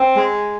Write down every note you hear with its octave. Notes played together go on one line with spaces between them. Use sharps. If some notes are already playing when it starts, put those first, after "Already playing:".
Already playing: C4
G#3